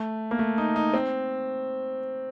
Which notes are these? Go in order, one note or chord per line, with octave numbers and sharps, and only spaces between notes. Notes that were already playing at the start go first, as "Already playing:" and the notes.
Already playing: A3
A#3
A3
D#4
D#4
C4